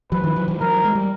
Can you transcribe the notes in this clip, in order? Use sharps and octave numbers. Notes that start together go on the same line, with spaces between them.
E3 F#3 B4
D#3 F3
E3 F#3
E3 F#3
E3 F#3 A#4
G#3
G3